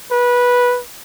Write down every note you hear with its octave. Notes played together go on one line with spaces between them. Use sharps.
B4